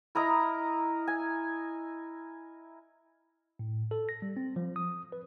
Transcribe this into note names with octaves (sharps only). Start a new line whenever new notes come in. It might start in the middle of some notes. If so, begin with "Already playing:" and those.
E4 A#4 D#5 A#5
G#5
A2
A4
A#6
G3
C4
F3
D#6
B4